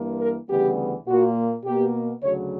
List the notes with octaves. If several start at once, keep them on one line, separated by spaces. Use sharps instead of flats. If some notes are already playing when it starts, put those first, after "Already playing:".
Already playing: G2 E3 A#3
A#4
D2 C#3 E3 G3 B3 G4
A#2 A#3 F#4
B2 A#3 G4
D2 C#3 F#3 C#5